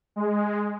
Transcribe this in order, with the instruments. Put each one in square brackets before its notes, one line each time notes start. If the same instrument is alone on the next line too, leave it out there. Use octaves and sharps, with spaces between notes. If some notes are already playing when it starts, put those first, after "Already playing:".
[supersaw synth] G#3